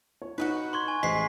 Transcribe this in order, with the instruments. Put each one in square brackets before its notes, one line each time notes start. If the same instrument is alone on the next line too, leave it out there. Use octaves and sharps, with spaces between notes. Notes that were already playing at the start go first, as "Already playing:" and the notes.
[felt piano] C#5
[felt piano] D#4 [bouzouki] F#4 G#4 B4
[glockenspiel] C6 C#6 G#6
G#5
[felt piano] A1 C5 D#5 [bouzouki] G#3 [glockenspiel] B6 C7